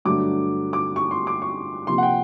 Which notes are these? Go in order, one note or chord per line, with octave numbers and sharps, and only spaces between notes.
G2 D3 F#3 A3 D6
D6
C#6
C6
D6
C#6
C3 F3 A#3 C6
F#5
G5